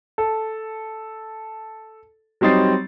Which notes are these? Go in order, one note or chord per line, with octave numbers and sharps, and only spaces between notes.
A4
F#3 G3 C4 D#4 A6 C7